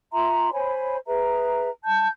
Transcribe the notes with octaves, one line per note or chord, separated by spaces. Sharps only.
F4 E5 A#5 C6
C5 C#5 G#5 B5
G#4 B4 E5 A#5
A5 G6